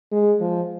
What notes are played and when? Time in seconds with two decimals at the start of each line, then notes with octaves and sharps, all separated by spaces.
0.12 G#3
0.41 F3